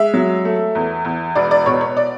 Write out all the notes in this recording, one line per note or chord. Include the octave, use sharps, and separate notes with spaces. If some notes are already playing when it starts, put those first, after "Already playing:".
Already playing: G#3 E5
F#3
A3
E2
E2
E1 D5
D5
B2 C#5
C#5
D5